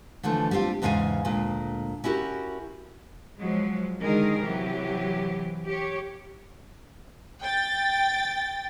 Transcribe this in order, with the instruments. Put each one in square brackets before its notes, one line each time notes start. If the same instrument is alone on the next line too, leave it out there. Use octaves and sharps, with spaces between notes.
[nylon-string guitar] D3 E3 F3 A3
G3 B3 C4 F4 G4
E2 G#2 C#3 A4 F5 G#5
D2 A#2 G#3
C#4 E4 F#4 G4 A#4
[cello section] F3 F#3 G#3
D3 D#3 G#3 G#4 A#4
C3 E3 F#3 G4
G4 C#5
[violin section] G5 A6